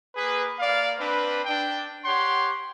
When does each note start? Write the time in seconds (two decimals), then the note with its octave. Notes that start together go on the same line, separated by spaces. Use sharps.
0.15 A#3 G#4 B4
0.59 A#3 D5 F5
0.98 C4 D4 B4
1.46 D4 G5
2.04 G4 C#5 F#5 C6